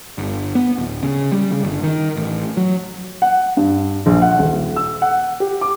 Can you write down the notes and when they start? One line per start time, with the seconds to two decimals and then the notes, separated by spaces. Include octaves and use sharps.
0.18 G1
0.55 B3
0.78 D1
1.03 C#3
1.32 G3
1.52 C#3
1.64 G1
1.83 D#3
2.17 A1
2.57 F#3
3.22 F#5
3.57 G2
4.06 A#1
4.22 F#5
4.39 D#1
4.76 E6
5.02 F#5
5.40 G4
5.61 D6